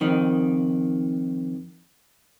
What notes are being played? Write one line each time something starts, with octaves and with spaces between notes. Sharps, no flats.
F2 D#3